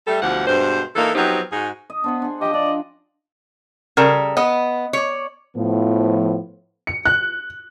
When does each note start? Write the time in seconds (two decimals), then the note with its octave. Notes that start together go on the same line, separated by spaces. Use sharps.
0.07 G3 A3 A4
0.23 D2 B2 E3 F3 G4 F#5
0.47 G2 B2 G#3 C5
0.96 E3 A#3 D#4 A4
1.15 F3 F#3 B3 C4 D#4 G4
1.52 G#2 D#4 F#4 G#4
1.90 D#5
2.04 B3 D4 C5 F#5
2.22 D4 G#4
2.41 F3 G4 D#5 G5
2.54 D4 D5
3.97 C#3 G3 A4 A#4
4.37 B3 D#5
4.93 C#5 D5
5.56 A2 F3 B3
6.87 C#7
7.05 F#6